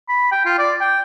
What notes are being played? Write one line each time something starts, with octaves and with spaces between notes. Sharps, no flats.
B5
G5
F4
D5
G5